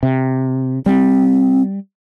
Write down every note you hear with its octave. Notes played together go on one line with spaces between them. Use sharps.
C3
G3 C4